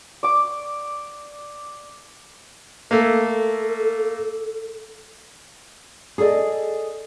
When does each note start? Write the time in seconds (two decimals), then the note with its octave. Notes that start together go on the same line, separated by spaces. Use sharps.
0.23 D5 D6
2.91 A3 A#3 A4
6.18 G#4 A4 C5 D5 D#5